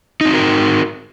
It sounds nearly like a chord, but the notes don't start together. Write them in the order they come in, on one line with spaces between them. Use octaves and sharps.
D#4 C4 F#4 A#4